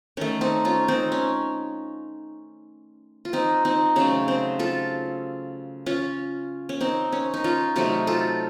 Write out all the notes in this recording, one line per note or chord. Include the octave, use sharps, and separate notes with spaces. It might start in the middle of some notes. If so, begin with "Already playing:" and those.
D#3 A3 C#4
C4 D#4
C#4 F4
C4 D#4
C#4
F4
C4 D#4
C4 D#4
C#3 F#3 A3 C#4
C4
F4 A4
C#4 F4
C#4
C4 D#4
C#4
D#4
C#4 F4
C3 F#3 A3 D#4 F#4
F4 A4